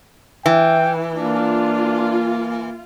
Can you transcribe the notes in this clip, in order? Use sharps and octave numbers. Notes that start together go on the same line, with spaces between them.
E3 G5
A#3 D4 F4